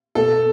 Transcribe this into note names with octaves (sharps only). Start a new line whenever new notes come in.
B2 A4